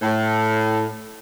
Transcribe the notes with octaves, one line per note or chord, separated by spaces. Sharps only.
A2